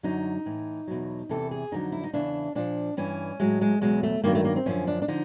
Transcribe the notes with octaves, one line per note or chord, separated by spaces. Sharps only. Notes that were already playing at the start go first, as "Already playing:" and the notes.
F#2 D3 F#3 D#4
A2 E3
E2 B2 F#3
E2 C3 E3 A4
G#4
F2 D3 F#3 D#4
E4
D#4
E2 C#3 E3 D4
A#2 F3 D4
G2 E3 C#4
A2 F#3 G#3
G#3
E2 B2 F#3 G#3
A3
G2 D#3 F#3 A#3
A3
A#3
C4
F#2 D3 F3 C#4
D4
D4
D3 F3 D#4